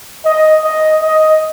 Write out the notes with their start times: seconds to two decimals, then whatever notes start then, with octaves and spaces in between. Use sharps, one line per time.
0.25 D#5
0.64 D#5
1.02 D#5